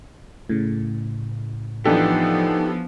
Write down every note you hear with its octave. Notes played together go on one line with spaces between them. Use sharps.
A2 C#3
E3 F3 B3 D4 D#4 G4 A4